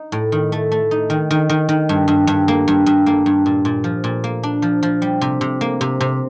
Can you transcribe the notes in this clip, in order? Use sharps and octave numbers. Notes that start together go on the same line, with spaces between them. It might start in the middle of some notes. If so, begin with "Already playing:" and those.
Already playing: D#4
A2
D#3
A3
A3
D#4
D#3
D#3
D#3
D#3
G2
G2
G2
A#3
G2
G2
A#3
G2
A#2
A#2
F3
A#2
A#3
D4
F3
F3
G3
C3
C3
A#3
C3
C3